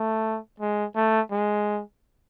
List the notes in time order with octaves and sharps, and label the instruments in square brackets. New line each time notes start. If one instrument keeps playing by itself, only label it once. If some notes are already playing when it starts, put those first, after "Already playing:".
Already playing: [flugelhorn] A3
G#3
A3
G#3